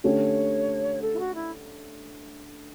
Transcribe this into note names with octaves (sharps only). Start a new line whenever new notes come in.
D3 A3 C#4 G4 C#5
A4
E4
F#4
E4